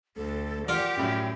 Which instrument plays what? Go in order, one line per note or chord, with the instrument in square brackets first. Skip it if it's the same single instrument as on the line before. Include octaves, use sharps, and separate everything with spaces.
[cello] D2 [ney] A4
[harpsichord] F4 A#4 D5 [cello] G4 [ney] F#5
[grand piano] F#2 A2 F#3 [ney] G5